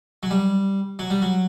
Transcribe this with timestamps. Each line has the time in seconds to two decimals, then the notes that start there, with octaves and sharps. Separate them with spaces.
0.23 F#3
0.31 G3
0.99 F#3
1.10 G3
1.22 F#3